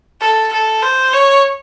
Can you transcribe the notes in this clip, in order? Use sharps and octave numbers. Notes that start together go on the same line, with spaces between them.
A4
A4
C5
C#5